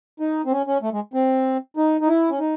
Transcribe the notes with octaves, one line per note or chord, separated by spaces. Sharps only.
D#4
C4
C#4
C#4
A3
G#3
C4
D#4
D#4
E4
C#4
D#4